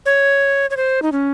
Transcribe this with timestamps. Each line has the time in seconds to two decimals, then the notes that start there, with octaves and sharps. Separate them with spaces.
0.06 C#5
0.70 C#5
0.77 C5
1.02 D#4
1.12 C#4